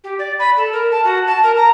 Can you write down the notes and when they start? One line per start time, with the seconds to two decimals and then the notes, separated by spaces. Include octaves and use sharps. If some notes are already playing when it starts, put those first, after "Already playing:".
0.04 G4
0.19 D5
0.39 B5
0.57 A4
0.72 A#4
0.91 A5
1.04 F#4
1.27 A5
1.43 A#4
1.57 A#5